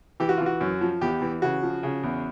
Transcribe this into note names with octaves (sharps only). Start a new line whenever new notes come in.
E3 G4
F#4
E3 F4
F#4
F#2
F3
E2 G4
E3
C#3 F#4
F3
C#3
E2